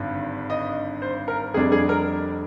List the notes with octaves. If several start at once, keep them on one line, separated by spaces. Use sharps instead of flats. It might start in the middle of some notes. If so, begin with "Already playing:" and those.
Already playing: G#1 G2 D3
D#5
C5
A#4
F1 F2 C3 G3 D4 G#4
G#4
A#4